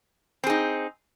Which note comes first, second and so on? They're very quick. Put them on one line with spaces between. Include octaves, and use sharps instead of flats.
C4 G#4 D#4